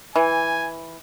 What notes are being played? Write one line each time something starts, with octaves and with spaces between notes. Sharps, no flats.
E3 G#5